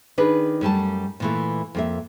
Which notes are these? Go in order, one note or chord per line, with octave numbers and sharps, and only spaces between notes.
D#3 D4 G#4 B4
F#2 G3 A3 A5
A#2 E3 A3
F2 A#3 E5